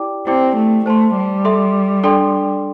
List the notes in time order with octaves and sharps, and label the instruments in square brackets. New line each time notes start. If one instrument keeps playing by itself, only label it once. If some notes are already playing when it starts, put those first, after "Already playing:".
Already playing: [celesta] E4 G4 D5 G5 D6
[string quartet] C4 [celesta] E4 G4 D5 G5 D6
[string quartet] A3
[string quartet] A3 [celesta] C5 A5 C6
[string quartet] G3
[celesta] A4 E5 C6
D4 A4 D5 G5 C6